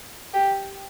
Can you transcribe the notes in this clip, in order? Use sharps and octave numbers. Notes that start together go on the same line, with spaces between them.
G4